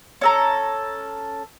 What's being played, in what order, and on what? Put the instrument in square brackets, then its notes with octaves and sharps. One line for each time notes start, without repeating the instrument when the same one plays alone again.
[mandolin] C#4 A4 A#5